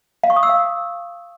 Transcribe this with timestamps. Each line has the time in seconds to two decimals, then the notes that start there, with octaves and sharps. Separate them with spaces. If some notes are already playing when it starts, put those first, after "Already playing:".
0.23 F5
0.30 C#6
0.36 D#6
0.43 E6
0.49 F5